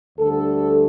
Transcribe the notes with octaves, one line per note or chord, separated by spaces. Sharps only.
D2 D3 G3 A4